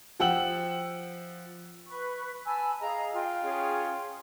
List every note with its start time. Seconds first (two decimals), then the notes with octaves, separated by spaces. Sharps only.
0.20 F3 F#5 G5 E6 F#7
1.87 B4 C#6
2.46 G#5 A5 B5 E6
2.81 G#4 D#5 F5 A#5
3.14 F4 G5
3.42 C#4 G#4